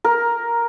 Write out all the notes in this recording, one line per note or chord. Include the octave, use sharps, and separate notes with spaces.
A#4